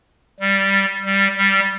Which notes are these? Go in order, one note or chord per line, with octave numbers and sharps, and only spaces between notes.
G3
G3
G3